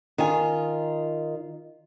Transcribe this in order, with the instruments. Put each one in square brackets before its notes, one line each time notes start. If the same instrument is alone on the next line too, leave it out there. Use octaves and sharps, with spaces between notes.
[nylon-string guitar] D#3 F4 D#5 G#5